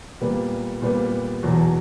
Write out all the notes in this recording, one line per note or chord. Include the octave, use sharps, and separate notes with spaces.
A#2 G3 B3
A#2 G3 B3
E2 B2 F#3